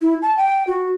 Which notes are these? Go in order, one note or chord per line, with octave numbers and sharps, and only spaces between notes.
E4
A5
G5
F#4